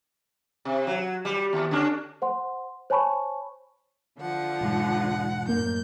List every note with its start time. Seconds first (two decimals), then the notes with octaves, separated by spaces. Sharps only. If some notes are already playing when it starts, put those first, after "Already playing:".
0.65 C3
0.87 F#3
1.25 G3
1.53 D#2
1.71 D3 C#4 D4
2.22 C5 F#5 C6
2.90 C5 C#5 G#5 A5 B5 C#6
4.19 D3 F3 F#5
4.61 E1 G#2
5.49 F#2 A2 A#3 G6